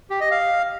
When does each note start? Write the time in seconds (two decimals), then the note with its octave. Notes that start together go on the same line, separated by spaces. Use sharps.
0.10 G4
0.20 D#5
0.31 F5